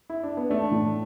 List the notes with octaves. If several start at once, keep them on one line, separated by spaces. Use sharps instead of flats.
E4
D4
B3
A3 D4
A2